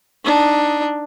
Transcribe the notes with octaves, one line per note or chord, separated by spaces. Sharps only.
D4 D#4